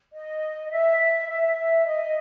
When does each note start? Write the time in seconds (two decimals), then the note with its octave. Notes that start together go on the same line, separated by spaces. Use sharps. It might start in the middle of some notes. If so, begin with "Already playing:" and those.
0.14 D#5
0.71 E5
1.28 E5
1.86 D#5